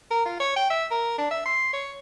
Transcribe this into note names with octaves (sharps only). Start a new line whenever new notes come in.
A#4
F4
C#5
G5
E5
A#4
D4
E5
C6
C#5